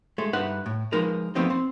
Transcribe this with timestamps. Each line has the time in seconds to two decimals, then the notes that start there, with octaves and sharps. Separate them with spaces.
0.18 G#3 A3
0.33 G2 D#4 B4 E5 F#5
0.66 A2
0.92 F3 G#3 D#4 A#4 B4
1.35 F3 A3 B3 C4 D#4
1.50 C4